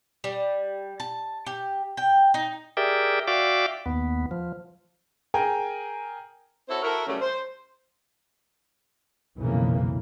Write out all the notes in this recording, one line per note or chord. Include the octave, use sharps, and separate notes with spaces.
G3
A5
G4
G5
D#4
G4 G#4 A#4 D5 E5 G5
F#4 D5 E5 F5 G5 D6
D#2 B3
F3
G#4 A#4 G5 G#5 A#5
C4 E4 F#4 A4 C5 C#5
E4 F#4 A4 A#4
C#3 F#3 G3 A3 C#4
C5
B1 F2 A#2 C#3 E3 A#3